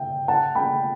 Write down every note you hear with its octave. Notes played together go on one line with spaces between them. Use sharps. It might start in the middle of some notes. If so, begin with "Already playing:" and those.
Already playing: E5 G5
F#5 A5
G5 B5